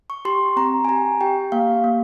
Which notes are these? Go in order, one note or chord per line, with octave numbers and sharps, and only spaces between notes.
C#6
G4 C6
C4 A#5
G#5
G4 A#5
G4 G5
A#3 F5
A#3